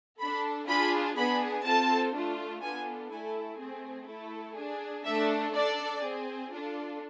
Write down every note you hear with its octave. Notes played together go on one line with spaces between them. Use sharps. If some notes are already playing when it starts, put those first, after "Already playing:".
D4 A4 B5
D4 F4 G#4 B5
B3 D4 G#4 B5
C4 F4 A4 A5
A3 D4 F4
B3 D4 F4 A4 G#5
A3 E4 A4 G#5
A3 C4 G#4
A3 E4 A4
D4 G#4
A3 D4 A4 E5
D4 A4 D5
C4 G#4
D4 F4 A4